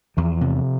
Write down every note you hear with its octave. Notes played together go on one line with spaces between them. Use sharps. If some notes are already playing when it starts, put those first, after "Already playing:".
E2 F3
C3